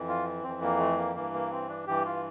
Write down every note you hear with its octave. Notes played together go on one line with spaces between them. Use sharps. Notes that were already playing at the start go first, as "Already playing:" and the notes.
Already playing: F2 E3
F4
F2 E3 C4
A#3
A3
A#3
G2 E3 A#3
A#3
C4
D4
G2 E3 G4
F4